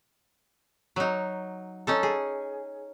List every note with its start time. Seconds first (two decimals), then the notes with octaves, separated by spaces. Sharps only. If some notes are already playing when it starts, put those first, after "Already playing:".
0.96 F#3 D#4
1.87 C#4 D#4 A4
2.03 G#4